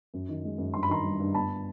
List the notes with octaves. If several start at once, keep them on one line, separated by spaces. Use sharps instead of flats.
F#2
D#3
G#3
F#2
G2 C6
B5
D#3 A#5 C6
G3
G2
G1 A5 B5